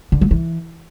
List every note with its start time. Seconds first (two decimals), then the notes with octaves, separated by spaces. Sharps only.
0.12 D3
0.21 F#3
0.31 E3